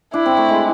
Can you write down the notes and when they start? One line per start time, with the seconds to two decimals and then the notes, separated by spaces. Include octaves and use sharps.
0.14 D4 E4
0.26 C4
0.37 A3
0.49 G#3